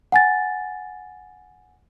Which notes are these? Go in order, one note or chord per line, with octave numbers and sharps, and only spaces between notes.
F#5 G#5 A6